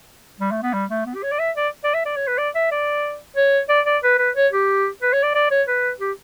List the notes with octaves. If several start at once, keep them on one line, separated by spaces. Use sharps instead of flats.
G3
A3
B3
G3
A3
B3
G4
C#5
D5
E5
D5
D5
E5
D5
C#5
B4
D5
E5
D5
C#5
D5
D5
B4
B4
C#5
G4
B4
C#5
D5
D5
C#5
B4
G4